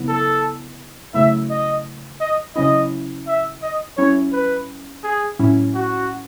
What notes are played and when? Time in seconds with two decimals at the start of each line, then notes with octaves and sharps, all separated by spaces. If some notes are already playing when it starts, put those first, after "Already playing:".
Already playing: C#3 F#3 B3 E4
0.08 A4
1.14 C#3 F#3 A3 E4 E5
1.50 D#5
2.21 D#5
2.56 C#3 F#3 C#4 E4 D#5
3.27 E5
3.62 D#5
3.97 F#3 C#4 E4 C#5
4.33 B4
5.04 G#4
5.39 A2 F#3 C#4 E4
5.74 F#4